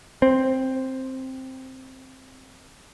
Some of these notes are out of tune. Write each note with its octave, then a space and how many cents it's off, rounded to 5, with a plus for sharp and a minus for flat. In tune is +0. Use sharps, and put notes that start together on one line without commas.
C4 +5